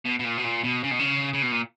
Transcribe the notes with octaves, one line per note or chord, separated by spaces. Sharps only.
B2
B2
A#2
B2
A#2
B2
C#3
B2
C#3
C#3
B2
A#2